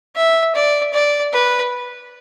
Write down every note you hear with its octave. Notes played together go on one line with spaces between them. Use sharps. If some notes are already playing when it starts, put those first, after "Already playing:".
E5
D5
D5
B4